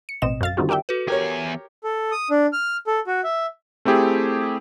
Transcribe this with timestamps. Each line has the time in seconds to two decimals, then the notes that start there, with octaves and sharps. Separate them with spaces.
0.09 C#7
0.22 A1 B2 C4 D#5 E7
0.41 F#2 F5 A6
0.57 D3 D#3 G3 C4 F4 F#4
0.69 G4 A#4 D5 E5 G5
0.89 F#4 A4 B4
1.08 E2 G4 A#4 C#5 G#5
1.84 A4
2.12 D#6
2.30 D4
2.53 F6
2.87 A4
3.07 F#4
3.24 E5
3.85 A3 C4 E4 G4 G#4